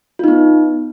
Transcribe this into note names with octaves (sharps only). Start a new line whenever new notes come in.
B3 D#4 F4